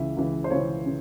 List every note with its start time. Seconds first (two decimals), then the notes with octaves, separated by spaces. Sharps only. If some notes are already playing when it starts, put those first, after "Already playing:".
Already playing: C#2 C#3 E3 E5
0.17 C#2 C#3 E3
0.44 C5
0.50 C#2 C#3 E3 C#5
0.86 C#3